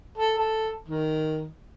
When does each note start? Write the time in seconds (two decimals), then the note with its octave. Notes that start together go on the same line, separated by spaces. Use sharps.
0.17 A4
0.38 A4
0.88 D#3